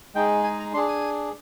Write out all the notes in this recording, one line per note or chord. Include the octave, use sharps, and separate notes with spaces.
G#3 D#4 G#4 G5
G#5
A#5
D4 G#4 C6
G#5